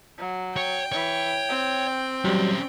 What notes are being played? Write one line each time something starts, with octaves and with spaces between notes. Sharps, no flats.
F#3
C#5 G5
E3 C#5
C4
F#3 G3 C#4 G4